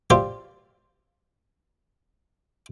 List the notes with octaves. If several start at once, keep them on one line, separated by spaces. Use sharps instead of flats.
F4 G4 C5 D5 E5